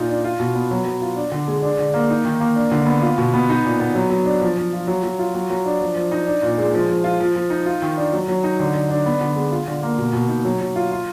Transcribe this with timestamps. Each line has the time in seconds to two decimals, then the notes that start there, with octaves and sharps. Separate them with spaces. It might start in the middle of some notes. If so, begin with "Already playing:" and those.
Already playing: A#2 D#4 F4
0.09 D4
0.24 F4
0.40 B2
0.55 B3
0.71 F#3
0.85 F#3
1.02 F4
1.16 D4
1.32 D3
1.48 G#3
1.62 D4
1.79 D3
1.94 A#3
2.10 D#4
2.25 D#3
2.40 A#3
2.56 D4
2.71 D3
2.86 B3
3.02 F4
3.18 B2
3.34 B3
3.49 D#4
3.65 A#2
3.80 B3
3.95 F#3
4.10 F#3
4.26 D4
4.41 F3
4.58 F3
4.73 F4
4.87 F#3
5.03 F#3
5.19 F4
5.35 F#3
5.50 F#3
5.66 D4
5.81 F3
5.96 F3
6.12 D#4
6.26 D4
6.42 A#2
6.58 G#3
6.74 F3
6.89 F3
7.04 F4
7.20 F3
7.36 F3
7.50 D#4
7.66 F4
7.82 D#3
7.97 D4
8.13 F#3
8.28 F#3
8.44 D#4
8.60 D3
8.75 D3
8.90 D4
9.06 B3
9.21 D3
9.36 G#3
9.52 F4
9.68 D3
9.83 A#3
9.98 B2
10.13 B2
10.29 D#4
10.45 F#3
10.61 F#3
10.76 F4
10.92 F4